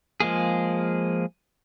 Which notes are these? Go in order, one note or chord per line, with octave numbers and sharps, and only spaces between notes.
F3 G#3 A#3 G#4